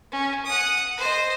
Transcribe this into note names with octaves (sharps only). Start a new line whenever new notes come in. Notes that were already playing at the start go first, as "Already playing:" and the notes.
C#4
F#5 D#6
C5 D#5